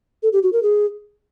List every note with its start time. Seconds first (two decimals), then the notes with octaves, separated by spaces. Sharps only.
0.23 A4
0.33 G4
0.43 F#4
0.53 A#4
0.63 G#4